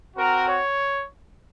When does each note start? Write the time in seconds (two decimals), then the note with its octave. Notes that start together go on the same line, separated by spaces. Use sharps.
0.15 C4 F#4 A#4
0.46 C#5